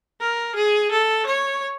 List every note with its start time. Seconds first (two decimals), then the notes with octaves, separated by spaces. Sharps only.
0.20 A#4
0.55 G#4
0.91 A4
1.26 C#5